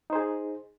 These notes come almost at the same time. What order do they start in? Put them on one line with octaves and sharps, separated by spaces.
D#4 C5 G#4